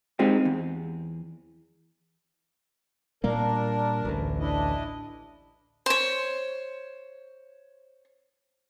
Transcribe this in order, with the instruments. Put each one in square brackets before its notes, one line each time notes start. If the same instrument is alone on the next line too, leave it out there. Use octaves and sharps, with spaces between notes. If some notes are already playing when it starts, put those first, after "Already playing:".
[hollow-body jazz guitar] G#3 C4 D#4 F4 G4
E2
[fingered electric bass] A#2 G3 A#3 [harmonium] D4 A#4
[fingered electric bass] A1 D2
[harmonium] D4 E4 D#5
[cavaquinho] C5 C#5